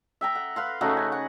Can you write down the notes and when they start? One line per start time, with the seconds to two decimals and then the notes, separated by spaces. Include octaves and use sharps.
0.21 E5 G5 A#5
0.35 F#5
0.56 B4 F5 C6
0.81 C#3 A3 D#4 F#4
0.97 G#5
1.12 F#5